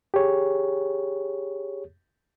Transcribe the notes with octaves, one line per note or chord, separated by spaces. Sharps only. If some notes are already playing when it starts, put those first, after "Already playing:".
G4 G#4 C#5